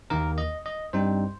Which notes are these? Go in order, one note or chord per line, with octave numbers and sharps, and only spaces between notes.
D#2 D#3 A#3 A#4
D#5
D#5
G2 G3 C4 D#4 C5